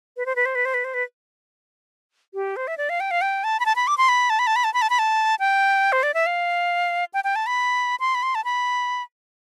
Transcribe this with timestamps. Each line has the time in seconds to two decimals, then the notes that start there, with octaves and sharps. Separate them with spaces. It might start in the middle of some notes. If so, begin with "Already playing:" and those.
0.17 B4
0.26 C5
0.36 B4
0.46 C5
0.55 B4
0.65 C5
0.74 B4
0.84 C5
0.94 B4
2.34 G4
2.56 C5
2.68 E5
2.78 D5
2.89 F5
3.00 G5
3.11 F5
3.21 G5
3.44 A5
3.60 B5
3.66 A5
3.76 B5
3.87 D6
3.98 C6
4.09 B5
4.30 A5
4.39 B5
4.47 A5
4.56 B5
4.64 A5
4.74 B5
4.82 A5
4.90 B5
4.99 A5
5.39 G5
5.92 C5
6.03 D5
6.14 E5
6.26 F5
7.14 G5
7.24 G5
7.36 A5
7.47 B5
8.00 C6
8.15 B5
8.23 C6
8.35 A5
8.45 B5